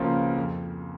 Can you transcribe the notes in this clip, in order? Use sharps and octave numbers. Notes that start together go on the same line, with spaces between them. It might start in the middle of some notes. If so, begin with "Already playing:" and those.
Already playing: C#2 C#3 F3 A#3 F4
F2